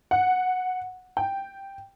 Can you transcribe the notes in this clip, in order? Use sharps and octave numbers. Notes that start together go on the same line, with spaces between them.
F#5
G5